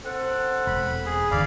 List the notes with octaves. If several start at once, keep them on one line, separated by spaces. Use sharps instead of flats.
C4 A4 F#5
E1 B5
G#4
G1 D#2 D3 D5 F5 B5